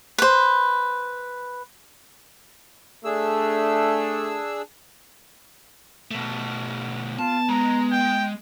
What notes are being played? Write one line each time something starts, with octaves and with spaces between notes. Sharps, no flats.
B4 C5
A3 D4 G#4 E6
B2 A3
B3 F4 A5
G#3 A#5
G5